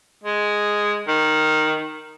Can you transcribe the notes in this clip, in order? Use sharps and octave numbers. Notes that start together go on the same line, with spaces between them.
G#3
D#3